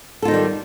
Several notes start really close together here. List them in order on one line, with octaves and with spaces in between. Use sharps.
A4 F4 D#4 D#3 G3